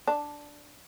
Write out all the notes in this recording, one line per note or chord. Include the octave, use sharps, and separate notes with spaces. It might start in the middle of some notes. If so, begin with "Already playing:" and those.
D4